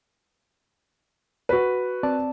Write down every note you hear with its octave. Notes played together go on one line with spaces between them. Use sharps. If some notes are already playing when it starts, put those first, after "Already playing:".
F#4 B4
C4 D5 A5